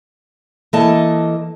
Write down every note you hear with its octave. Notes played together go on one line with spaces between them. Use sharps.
E3 A#3 A4 D#5 A5